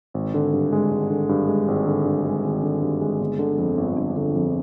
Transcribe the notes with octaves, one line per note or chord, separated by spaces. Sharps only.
G#1
D3
G2
G#3
G#1
D3
G2
G#3
G#1
D3
G2
G#3
G#1
D3
G2
G#3
G1
D3
F2
G1
G1
D3
F2